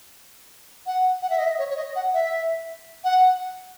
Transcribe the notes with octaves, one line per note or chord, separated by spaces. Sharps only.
F#5
F#5
E5
D#5
E5
C#5
C#5
D#5
F#5
E5
F#5